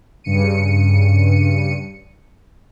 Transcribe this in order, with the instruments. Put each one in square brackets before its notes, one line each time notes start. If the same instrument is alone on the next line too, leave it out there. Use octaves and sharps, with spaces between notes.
[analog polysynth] G2 C#3 C#7 D#7